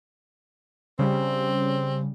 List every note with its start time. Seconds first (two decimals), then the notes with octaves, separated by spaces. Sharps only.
0.99 C#3 G3 C4